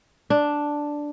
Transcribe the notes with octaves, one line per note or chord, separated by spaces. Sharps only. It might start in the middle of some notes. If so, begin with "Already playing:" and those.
D4